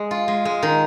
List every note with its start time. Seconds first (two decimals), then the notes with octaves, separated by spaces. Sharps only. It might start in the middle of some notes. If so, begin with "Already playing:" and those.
Already playing: G#3
0.11 F4
0.28 G#3
0.45 G#3
0.63 D#3